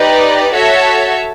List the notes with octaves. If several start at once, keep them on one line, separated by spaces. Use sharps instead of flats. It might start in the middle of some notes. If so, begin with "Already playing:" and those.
Already playing: D#4 G4 B4 D5
F#4 A4 C#5 E5 A5